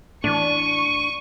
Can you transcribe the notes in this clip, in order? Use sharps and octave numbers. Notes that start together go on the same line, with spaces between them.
A2 E3 D4 C#6 D#7